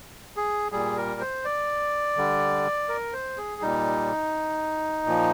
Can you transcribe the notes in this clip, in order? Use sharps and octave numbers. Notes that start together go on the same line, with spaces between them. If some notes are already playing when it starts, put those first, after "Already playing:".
G#4
A#2 G3 G#4
A#4
C5
D5
D3 G3
A#4
C5
G#4
A#2 G3 D#4
A#2 F3